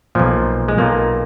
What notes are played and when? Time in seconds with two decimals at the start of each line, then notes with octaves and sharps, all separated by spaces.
0.15 B1 A#2 F3
0.68 G#3
0.78 B1 A#2 A#3